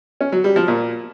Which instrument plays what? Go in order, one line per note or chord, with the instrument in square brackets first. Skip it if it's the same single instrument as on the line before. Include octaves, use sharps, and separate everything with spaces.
[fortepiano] C#4
F#3
G3
F3
A#2